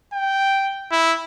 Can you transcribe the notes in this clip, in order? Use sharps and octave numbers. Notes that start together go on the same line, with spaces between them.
G5
E4